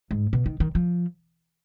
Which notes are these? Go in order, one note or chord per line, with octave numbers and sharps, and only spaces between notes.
G#2
B2
D#3
D#3
F3